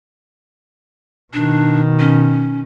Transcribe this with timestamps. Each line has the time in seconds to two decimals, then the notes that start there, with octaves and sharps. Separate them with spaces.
1.33 B2 D#3 D4
1.99 C#4